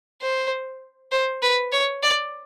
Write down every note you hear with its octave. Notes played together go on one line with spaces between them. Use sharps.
C5
C5
B4
C#5
D5